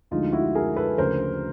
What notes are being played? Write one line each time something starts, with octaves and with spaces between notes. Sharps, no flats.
D2 D3 F3 G#3 D#4 F4
E4 F#4
G#4 A#4
A4 B4
D2 C#3 F3 A#4 C5